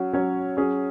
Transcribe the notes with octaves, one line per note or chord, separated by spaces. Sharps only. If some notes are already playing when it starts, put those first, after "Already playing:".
Already playing: F#3 C#4 F#4
F#3 C#4 F#4 C#5
F#3 C#4 G#4 C#5